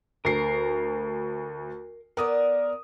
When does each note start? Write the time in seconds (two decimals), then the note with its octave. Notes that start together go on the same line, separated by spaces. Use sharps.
0.25 D2 A#4 C7
2.17 B3 A#4 D5 D#6